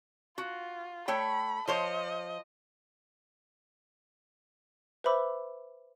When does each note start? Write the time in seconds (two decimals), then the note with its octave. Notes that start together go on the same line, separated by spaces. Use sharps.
0.38 F4 F#4
1.08 A3 C#5 G5 B5
1.68 F3 C5 C#5 D#5
5.04 B4 C5 E5 B5 D6 E6